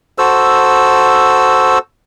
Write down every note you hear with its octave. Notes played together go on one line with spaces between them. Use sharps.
F#4 A4 C5 E6